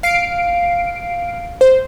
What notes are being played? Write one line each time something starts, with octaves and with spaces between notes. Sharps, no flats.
F5 C7 D7
C5